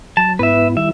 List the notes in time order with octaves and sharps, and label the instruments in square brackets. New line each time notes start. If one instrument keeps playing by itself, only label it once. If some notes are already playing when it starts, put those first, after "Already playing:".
[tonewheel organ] F#3 [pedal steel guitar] A5
[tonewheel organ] G#2 B3 E4 [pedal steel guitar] B4 E5
[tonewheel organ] D#3 G3 E4 [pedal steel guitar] E5